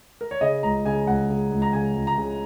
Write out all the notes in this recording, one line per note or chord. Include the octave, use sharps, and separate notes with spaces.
A#4
C#5
C#3 D#5
C#2 A#5
C#3 G#5
C#2 F#5
C#3
C#2
A#5
C#3 G#5
C#2
A#5
C#3